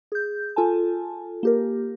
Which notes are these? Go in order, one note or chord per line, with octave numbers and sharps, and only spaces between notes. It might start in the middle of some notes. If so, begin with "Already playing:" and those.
G#4 G6
F4 A4 G#5 A5
A#3 G4 A#4